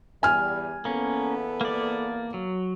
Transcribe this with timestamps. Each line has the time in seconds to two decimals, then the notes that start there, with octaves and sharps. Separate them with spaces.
0.23 E2 G3 G#5 F6
0.85 E2 A#3 B3 C#4 A4
1.61 A#3 D5
2.34 F#3